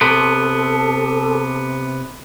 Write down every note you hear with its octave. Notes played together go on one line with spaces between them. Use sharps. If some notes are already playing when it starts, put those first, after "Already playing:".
C3 B3 A4